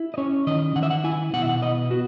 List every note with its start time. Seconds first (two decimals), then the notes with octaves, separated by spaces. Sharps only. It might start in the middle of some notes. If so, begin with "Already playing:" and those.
Already playing: E4
0.14 D#5
0.18 C#4 C#5
0.47 D#3 D#5
0.76 D#3 F#5
0.83 E5
0.91 F#5
1.04 E4 G#5
1.33 B2 F#5
1.42 E5
1.49 F#5
1.62 B3 D#5
1.91 B3 F#4